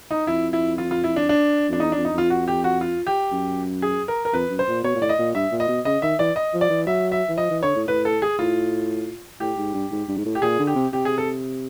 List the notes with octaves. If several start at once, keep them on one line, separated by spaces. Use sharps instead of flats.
D#4
F2 E4
E4
F4
F4
E4
D4
D4
F2 D4
E2 D#4
D4
F2
D#4
F2 F4
F#4
G4
F#4
F4
G4
F#2
G#4
A#4
A#4
F2 B4
F#2
C5
A#2
B2 C#5
A#2
A2 D5
D#5
A#2
G2 E5
A#2
D#5
B2
C#3 D#5
D#3 E5
E3 D5
D#5
F3
D5
E3
F#3 E5
E5
E3
F3 D#5
E3
D3 C#5
A2
A2 B4
A4
G#4
A2 F4
A2 G4
G#2
G2
G#2
G2
G#2
A2
G4
A#2 G#4
D3
G4
C3
C3 G4
G#4
A4